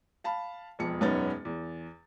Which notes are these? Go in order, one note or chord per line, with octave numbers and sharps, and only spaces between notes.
F5 A5 B5
E1 F2 C#7
E1 F#2 B3 C#4 D#4 A6
E2